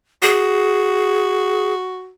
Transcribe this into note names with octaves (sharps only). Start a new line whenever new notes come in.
F#4 G#4